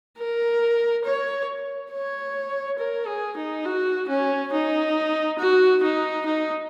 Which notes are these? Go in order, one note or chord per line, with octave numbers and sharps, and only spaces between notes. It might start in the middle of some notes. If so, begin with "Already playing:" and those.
A#4
C#5
C#5
A#4
G#4
D#4
F#4
C#4
D#4
F#4
D#4
D#4